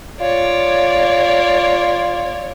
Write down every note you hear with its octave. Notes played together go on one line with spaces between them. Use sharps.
F4 C#5 D5